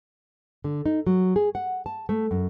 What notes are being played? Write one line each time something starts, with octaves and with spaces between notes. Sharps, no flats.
D3
D#4
F#3
G#4
F#5
A5
A3
F#2